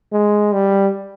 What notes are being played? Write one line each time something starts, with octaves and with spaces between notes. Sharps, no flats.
G#3
G3